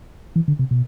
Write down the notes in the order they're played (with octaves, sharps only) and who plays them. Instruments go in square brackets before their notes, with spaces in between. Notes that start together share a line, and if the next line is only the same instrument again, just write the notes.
[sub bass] E3
D3
C3
B2